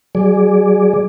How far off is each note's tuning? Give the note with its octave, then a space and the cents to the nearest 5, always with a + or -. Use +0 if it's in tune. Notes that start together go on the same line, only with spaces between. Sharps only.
F#3 +35 G#4 +0 D5 +0